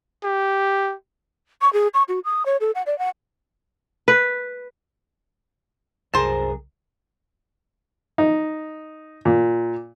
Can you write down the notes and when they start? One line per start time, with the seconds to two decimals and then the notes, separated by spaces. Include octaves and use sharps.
0.24 G4
1.62 C#6
1.73 G#4
1.94 C#6
2.08 F#4
2.25 D#6
2.46 C#5
2.61 A4
2.75 F#5
2.86 D5
2.99 F#5
4.08 B4
6.14 C2 F#2 G#4 A#4 C5 A5
8.18 D#4
9.25 A#2